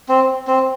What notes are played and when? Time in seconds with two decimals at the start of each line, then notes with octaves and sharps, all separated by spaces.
0.09 C4
0.47 C4